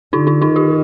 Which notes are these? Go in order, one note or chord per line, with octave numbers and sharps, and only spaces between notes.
D3 D#4 F4
D#4 F4
D#3 D#4 F4
F4 G4